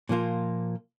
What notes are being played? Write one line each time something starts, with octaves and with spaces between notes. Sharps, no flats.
A#2 F3 A#3 F4